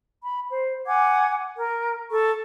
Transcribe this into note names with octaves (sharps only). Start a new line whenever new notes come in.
B5
C5
F#5 G#5 D6 G#6
A#4
A4 C#6